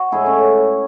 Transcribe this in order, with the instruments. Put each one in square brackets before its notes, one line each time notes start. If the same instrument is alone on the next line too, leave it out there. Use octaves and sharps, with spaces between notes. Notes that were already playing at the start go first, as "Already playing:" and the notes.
Already playing: [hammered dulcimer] F#4 C#5
A2 G#3 E4 G#4
A3 C#4